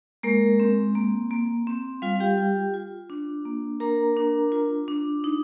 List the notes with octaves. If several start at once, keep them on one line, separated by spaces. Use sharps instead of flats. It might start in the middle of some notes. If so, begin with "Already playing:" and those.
G#3 A#3 A#4
C4
A#3
A#3
C4
G3 F4 F5
F5
G4 G5
F4
F4
D4
A#3
D4 A#4 A#5
D4
F4
D4
D#4